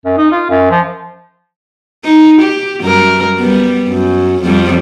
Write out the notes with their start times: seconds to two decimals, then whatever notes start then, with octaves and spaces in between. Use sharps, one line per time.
0.05 F#2
0.17 D#4
0.32 F4
0.50 F#2
0.70 F3
2.05 D#4
2.41 G4
2.81 F#2 G3 A#4
3.38 G3 B3
3.88 F#2
4.43 F2 G3